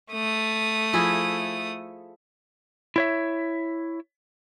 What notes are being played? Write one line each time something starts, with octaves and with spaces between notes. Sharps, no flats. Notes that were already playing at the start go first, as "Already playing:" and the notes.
A3 D#6
F3 E4 G#4
E4 C#5 E5